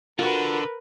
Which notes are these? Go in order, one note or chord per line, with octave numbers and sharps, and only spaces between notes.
D3 F4 F#4 A#4 B4